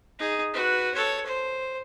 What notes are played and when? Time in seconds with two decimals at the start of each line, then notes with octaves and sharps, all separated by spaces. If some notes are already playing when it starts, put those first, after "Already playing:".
0.19 D#4 G#4
0.54 F#4 B4
0.94 A4 C#5
1.26 C5